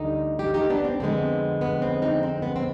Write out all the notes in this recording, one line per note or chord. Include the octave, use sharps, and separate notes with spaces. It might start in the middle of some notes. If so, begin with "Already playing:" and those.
Already playing: D2 D3 G3 D#4 G4
D#4 G4
D#4 G4
B3 D4
C4
F2 D3 G#3 B3 C4
B3
C4
C4 D#4
C4
B3
C4